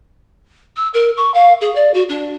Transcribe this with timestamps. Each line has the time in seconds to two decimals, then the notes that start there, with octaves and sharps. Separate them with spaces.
0.76 E6
0.94 A#4
1.17 C#6
1.34 F5
1.61 G#4
1.75 D5
1.94 F#4
2.09 D4